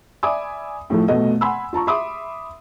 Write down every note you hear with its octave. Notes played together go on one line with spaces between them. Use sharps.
D5 E5 G#5 B5 D6 D#6
A2 F3 A3
F1 B2 A3 D#5
F#5 G#5 B5 C6 E6
F4 A5 A#5 C#6
E5 B5 C6 D6 D#6